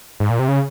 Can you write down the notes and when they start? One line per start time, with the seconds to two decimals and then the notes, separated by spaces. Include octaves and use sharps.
0.20 G#2
0.30 A#2
0.39 C3
0.48 C#3